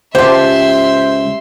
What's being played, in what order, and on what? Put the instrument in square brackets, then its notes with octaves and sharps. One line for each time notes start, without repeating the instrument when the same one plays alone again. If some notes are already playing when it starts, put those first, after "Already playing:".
[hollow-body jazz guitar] C#2 [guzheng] G4 A5 [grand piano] C5 [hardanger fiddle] E5 C6